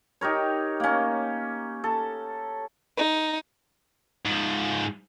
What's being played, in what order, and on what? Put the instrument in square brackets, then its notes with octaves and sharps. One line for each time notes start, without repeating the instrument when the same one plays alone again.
[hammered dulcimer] D#4 G4 A#4 C#5
A#3 C#4
A4
[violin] D#4
[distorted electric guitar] G#2 F3